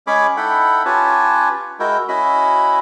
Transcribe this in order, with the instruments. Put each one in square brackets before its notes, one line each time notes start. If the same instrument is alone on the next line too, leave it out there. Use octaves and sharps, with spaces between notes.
[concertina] G#3 C#4 G#4 C#5 B5 D6
D#4 E4 A4 F#5 G5 B5
C#4 F4 G4 B4 C#5 A5
G#3 E4 F#4 A#4 G5
C#4 E4 F#4 D#5 B5